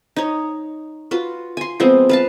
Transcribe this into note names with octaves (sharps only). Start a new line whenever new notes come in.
D#4 C#5
F4 F#4 B4
G#5 C6
F3 G#3 B3 C4
B4 F5 A5